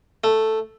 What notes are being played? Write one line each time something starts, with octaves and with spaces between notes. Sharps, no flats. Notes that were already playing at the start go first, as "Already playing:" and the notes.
A3